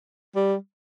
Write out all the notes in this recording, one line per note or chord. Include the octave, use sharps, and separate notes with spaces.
G3